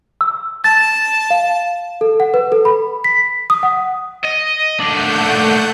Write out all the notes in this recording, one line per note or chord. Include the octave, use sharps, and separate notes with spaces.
E6
A5 A6
F5
A4
F#5
B4
A4
B5
B6
D#6
F#5
D#5
D#2 A3 D4 F#5 G6